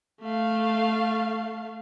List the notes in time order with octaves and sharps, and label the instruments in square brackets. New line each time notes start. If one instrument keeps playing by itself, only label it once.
[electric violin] A3 F5